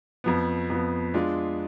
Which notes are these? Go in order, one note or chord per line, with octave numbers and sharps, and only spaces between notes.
F2 F3 B3
F2 F3 B3
G#3 D4 F4